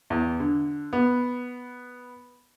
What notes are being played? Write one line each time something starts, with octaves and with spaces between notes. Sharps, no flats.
E2
D3
B3